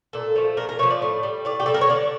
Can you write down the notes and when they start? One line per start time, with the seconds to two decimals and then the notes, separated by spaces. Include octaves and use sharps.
0.13 A#2 A4
0.36 F3 A3
0.57 A#2 A#4
0.69 A#4
0.79 A3 C#5
0.83 F3
0.90 D5
1.02 A2
1.23 G3
1.45 A2 D5
1.60 G4
1.66 G3 A4
1.74 A#4
1.81 C#5
1.89 D3 D5